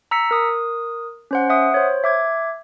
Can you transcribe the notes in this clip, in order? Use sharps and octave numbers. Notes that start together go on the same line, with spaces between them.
A#5 E6 B6 C#7
A#4 D#6
C#4 C5 F#5
E5 F#5 D#6
C5 C#5
E5 D6 G#6